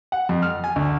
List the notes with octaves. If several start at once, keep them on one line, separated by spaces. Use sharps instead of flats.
F#5
F2
F6
G#5
D2